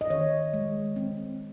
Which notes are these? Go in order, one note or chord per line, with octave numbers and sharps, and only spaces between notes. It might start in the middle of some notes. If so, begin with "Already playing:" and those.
D#5
D#3 C#5
G#3
C4